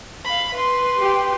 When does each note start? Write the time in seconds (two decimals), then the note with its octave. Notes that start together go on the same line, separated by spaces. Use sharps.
0.25 F5 B5
0.53 B4 C6
0.98 G4